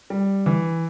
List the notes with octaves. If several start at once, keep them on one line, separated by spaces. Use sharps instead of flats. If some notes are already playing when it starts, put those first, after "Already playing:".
G3
E3